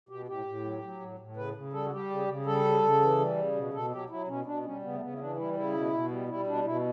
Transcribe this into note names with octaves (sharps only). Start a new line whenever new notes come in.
B2 G4
A2 G4
A2
F#3
F#3
A2
A2
C#3 B4
C#3
G3 A4
F#4
G3 G4
C#3
C#3
G3 A4
C#3
C#3
E3
G3
C#3
B2
B2 A4
F#3 G4
F#3 E4
B2 C#4
B2 D4
G3 C#4
C#3 B3
A3
C#3 B3
E4
E3 D4
G3 E4
C#3 E4
B2
B2
G3
G3 E4
B2 D4
B2 E4